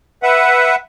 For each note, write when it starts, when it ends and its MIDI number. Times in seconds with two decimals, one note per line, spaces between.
0.23 0.76 71
0.23 0.76 76
0.23 0.76 78